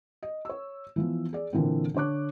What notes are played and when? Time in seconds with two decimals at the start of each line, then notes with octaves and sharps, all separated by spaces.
0.23 D#5
0.45 C#5 E6
0.96 E3 F3 B3
1.33 G#4 D5
1.53 A#2 D3 E3 A#3 C4
1.94 D3 D4 C#5 D6 F#6